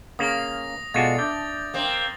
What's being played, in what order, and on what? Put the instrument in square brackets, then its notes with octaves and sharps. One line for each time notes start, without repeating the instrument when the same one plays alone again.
[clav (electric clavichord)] C#3 A#3 [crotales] D#6 A#6
[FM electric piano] B2 A4 D5 [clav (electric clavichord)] G#3 F4 F#4 [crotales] A6
[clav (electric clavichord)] D4 [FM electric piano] E5 D6 G6
[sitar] A#3 C4